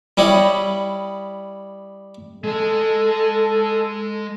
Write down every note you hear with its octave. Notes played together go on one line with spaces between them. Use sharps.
G3 E4 G4 C#5 D#5
G#3 A4 D#5